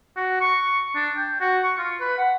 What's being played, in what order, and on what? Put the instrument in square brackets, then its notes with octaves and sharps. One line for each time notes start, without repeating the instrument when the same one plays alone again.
[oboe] F#4
C#6
D4
G5
F#4
C#6
F4
B4
F#5